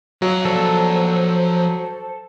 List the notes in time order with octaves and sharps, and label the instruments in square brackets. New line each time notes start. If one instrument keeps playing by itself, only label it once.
[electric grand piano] F#3 [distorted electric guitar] F5 G5
[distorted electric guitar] F3 D5 [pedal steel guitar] A4 [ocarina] C5